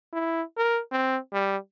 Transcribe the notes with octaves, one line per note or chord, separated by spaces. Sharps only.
E4
A#4
C4
G3